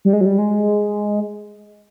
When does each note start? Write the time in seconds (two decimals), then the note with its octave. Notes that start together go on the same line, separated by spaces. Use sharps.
0.05 G3
0.13 G#3
0.21 F#3
0.25 G3
0.38 G#3